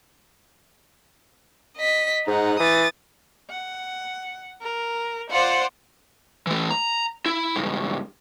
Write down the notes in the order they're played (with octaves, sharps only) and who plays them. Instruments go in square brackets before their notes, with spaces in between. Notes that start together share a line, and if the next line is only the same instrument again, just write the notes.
[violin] D#5 B6
[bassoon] G#2 [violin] D#4 F#5
[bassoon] E3 [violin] D#6 A6
[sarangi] F#5
A#4
[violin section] F4 C5 D5 [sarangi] F#5
[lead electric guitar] E3 A3
A#5
E4
C#2 G2